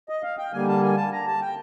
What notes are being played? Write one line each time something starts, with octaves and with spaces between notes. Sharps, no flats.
D#5
F5
G5
D3 G3 A#3 G#5
A5
G#5
A5
A#5
A5
G5